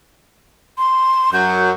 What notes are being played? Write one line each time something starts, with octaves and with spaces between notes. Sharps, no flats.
C6
F#2 F#3 G6